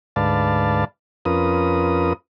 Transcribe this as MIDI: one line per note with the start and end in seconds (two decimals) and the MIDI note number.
0.16 0.85 38
0.16 0.85 44
0.16 0.85 71
0.16 0.85 74
0.16 0.85 77
0.16 0.85 81
1.25 2.13 41
1.25 2.13 61
1.25 2.13 65
1.25 2.13 70
1.25 2.13 71
1.25 2.13 87